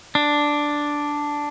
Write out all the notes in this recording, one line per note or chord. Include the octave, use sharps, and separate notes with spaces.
D4